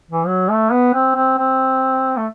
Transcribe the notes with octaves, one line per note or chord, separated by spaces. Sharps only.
E3
F#3
A3
B3
C4
C4
C4
A3